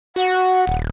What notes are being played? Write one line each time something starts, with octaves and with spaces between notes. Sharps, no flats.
F#4 F#5
D#1